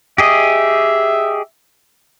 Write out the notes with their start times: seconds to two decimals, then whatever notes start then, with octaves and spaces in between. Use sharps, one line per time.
0.18 G4 G#4 D#5 E5